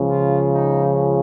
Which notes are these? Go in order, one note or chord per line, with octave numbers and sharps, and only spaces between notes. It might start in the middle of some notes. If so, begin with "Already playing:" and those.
Already playing: C#2 C#3 F3
F4
D#4